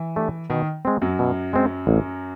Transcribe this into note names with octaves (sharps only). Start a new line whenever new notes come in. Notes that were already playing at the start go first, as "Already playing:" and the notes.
Already playing: E3
A3 D4 G4
B2 D#3
G#3 C4
F#2 F#3
B2
G#3 C4
A1